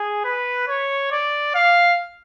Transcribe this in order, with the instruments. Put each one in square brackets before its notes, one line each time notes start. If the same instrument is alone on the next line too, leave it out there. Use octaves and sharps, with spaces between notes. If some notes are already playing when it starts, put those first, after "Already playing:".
Already playing: [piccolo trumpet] G#4
B4
C#5
D5
F5